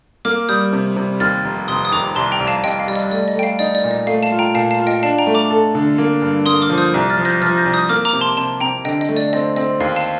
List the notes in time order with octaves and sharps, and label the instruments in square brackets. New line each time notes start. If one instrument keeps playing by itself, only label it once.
[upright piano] A#3 [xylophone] D6 F6
[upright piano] G3 [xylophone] D#6 G6
[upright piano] C3
C3
[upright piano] D#2 [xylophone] F6 A6
[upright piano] F1
[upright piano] F1 [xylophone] C6 D#6
[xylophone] D#6
[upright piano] D#2 [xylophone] A#5 D6
[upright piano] C2 [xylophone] A5 C6
[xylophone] G5 A#5
[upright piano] C2
[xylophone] F5 A5
[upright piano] C2 [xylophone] D#5 G5
[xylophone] F5
[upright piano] G3 [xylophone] D5
[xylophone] D#5
[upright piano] A3 [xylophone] D5
[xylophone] D#5
[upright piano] A3 [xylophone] G5
[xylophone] F5
[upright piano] D#4 [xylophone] D5
[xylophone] D5
[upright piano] A#2
[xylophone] D#5
[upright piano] A3 [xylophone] F5
[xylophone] F5 A5
[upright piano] F4
[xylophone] G5 A#5
[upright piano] A#2 [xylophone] F5 A5
[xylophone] F5 A5
[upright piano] F4
[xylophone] D#5 G5
[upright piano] D4 [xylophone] F5 A5
[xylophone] G5 A#5
[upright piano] A3
[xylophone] A#5 D6
[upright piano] A4
D3
A#3
G2
[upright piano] A#3 [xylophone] C6 D#6
[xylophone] D6 F6
[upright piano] F3
[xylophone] D#6 G6
[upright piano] C2
[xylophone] F6 A6
[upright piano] F3
[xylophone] G6 A#6
[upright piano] F3 [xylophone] F6 A6
[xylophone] G6 A#6
[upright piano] C2
[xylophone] D#6 G6
[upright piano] A#3 [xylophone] D6 F6
[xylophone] A#5 D6
[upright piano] C3
[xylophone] A5 C6
[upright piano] C3 [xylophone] A5 C6
[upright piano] C3 [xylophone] G5 A#5
[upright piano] D3 [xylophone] D#5 G5
[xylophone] D#5
[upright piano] A3
[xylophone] D5
[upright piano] C4 [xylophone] D#5
[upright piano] C4 [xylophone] D#5
[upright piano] D#2 [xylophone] F5
[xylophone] F5 A5